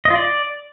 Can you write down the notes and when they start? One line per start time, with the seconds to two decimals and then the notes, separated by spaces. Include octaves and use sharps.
0.05 D#5
0.10 F4
0.15 D5